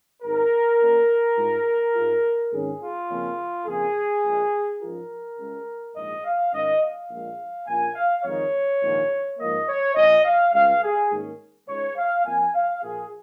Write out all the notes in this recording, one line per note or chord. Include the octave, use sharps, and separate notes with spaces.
G#1 G#2 G#3 D#4 A#4
A#2 A#3 C#4 F4
G#2 G#3 F4
G#2 G#3 F4
G#1 G#2 D#3 G#3 C#4 G#4
F4
F2 C#3 F3 A#3 C#4
F2 C#3 A#3 F4 G#4
A#1 A#2 G#3
G#2 F3 C#4 F4 A#4
C#2 C#3 G#3
A#1 G#2 G#3 D#5
F5
G#2 D#3 C#4 F4 D#5
F5
A#1 A#2 G#3
A#1 A#2 A#3 C#4 F4 G#5
F5
F2 D#3 G#3 D#4 C#5
A#1 G#2 D#3 A#3
G#2 F3 A#3 D#5
C#5
A#1 A#2 F3 C#4 D#5
F5
C#2 C#3 G#3 F5
G#4
G#2 D#3 A#3 C#4
C#2 C#3 G#3 D#4 C#5
F5
F2 F3 A#3 G#5
F5
A#2 F3 A#3 F4 G#4